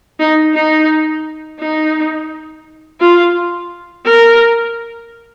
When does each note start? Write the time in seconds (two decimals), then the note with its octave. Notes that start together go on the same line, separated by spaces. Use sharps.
0.20 D#4
0.55 D#4
1.60 D#4
3.01 F4
4.06 A#4